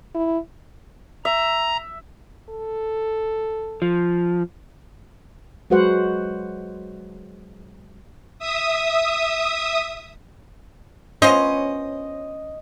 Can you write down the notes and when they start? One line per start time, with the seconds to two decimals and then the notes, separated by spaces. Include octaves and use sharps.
0.15 E4
1.25 E5 A#5
2.49 A4
3.82 F3
5.70 F#3 G#3 F#4 B4 C5 F#5
8.39 E5 D#6
11.22 B3 C#4 F4 C5 D#5